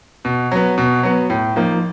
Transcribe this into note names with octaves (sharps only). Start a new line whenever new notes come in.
B2
F#3 B3
B2
F#3 B3
A2
F3 A#3 D#4